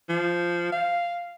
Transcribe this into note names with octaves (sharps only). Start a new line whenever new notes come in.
F3
F5